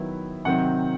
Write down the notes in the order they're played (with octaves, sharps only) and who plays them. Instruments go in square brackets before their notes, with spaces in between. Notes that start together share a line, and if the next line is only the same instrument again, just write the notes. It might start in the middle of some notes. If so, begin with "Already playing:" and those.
Already playing: [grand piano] D#3 F#3 B3 E4
C3 D#3 F#3 C4 F#5